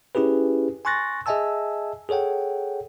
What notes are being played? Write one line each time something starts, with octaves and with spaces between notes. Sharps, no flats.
C#4 E4 G4 G#4 B4
G#5 C6 C#6 F#6 A6 A#6
G#4 D#5 E5 G#5 A5 E6
G#4 A4 C#5 F#5 G5